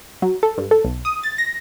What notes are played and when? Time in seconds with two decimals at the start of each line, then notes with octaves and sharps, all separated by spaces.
0.22 F#3
0.43 A4
0.58 G2
0.71 A4
0.85 B1
1.05 D#6
1.23 A6
1.38 A#6